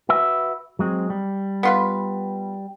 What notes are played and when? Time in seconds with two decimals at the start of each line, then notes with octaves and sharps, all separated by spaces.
0.09 F#4 B4 E5
0.79 F#3 G#3 C4
1.10 G3
1.63 B3 F4 B4